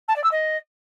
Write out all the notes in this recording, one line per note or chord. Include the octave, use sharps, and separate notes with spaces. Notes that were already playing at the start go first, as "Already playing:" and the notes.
A5
D5
E6
D#5